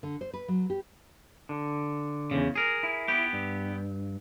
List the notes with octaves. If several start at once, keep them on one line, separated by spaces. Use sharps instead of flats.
D3
C5
B4
F#3
G4
D3
E2 G#2 C#3
G#4 A#4
E4
B3 G4
G2